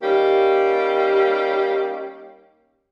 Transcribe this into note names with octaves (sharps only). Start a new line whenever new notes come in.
G3 A#3 C#4 D#4 G4